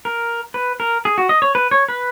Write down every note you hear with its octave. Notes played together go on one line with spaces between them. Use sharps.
A#4
B4
A#4
G#4
F#4
D#5
C#5
B4
C#5
B4